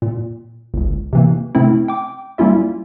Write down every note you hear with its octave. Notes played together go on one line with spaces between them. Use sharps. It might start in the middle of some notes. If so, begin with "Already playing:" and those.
A#2
G1 C#2
C3 E3 A#3
C3 A3 C4 C#4 E4
G5 D6
G3 A#3 C#4 E4 F4 E5